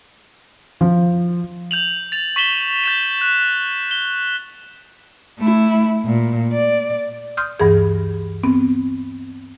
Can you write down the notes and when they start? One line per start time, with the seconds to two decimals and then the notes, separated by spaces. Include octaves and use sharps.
0.81 F3
1.71 G6 F7 F#7
2.12 A6 F7
2.36 C#6 B6 E7 F#7 G7
2.84 G6 A6 E7
3.21 F#6
3.91 G7
5.38 A3 E4
6.05 A#2
6.53 D5
7.37 C6 D#6 F6 G6
7.60 D2 G2 E3 G#4
8.44 B3 C4